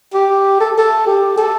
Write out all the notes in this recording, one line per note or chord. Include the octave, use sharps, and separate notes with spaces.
G4
A4
A4
G4
A4